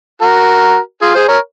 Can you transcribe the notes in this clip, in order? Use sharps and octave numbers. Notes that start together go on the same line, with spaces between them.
F#4 A#4
F4 G#4
G#4 C5
A#4 C#5